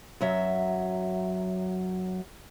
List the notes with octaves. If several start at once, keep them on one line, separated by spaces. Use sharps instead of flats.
F#2 F#3 E5